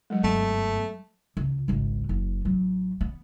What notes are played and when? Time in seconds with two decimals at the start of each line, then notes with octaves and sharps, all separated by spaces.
0.10 F#3 G#3
0.24 F#1 G2 A3 B3
1.37 C#2
1.68 G#1 C#2
2.09 F#1
2.45 A1 F#3
3.01 B3